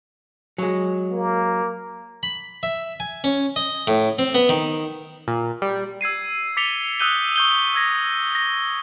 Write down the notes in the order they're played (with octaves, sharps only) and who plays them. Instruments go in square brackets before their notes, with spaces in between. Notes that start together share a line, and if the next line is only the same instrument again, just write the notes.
[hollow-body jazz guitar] F#3 G#3
[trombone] A#3
[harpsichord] B5
E5
G#5
C#4
D#5
A2
C4
B3
D#3
[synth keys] A#2
G3
[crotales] E6 G#6 C7 D#7
D6 A6 B6 C#7 F7 G7
D#6 E6 F#6 G6 D#7 G7
C#6 G6 G7
E6 G#6 A#6
A#6 G7